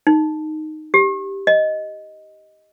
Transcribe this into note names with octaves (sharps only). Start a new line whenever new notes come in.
D#4
G4
D#5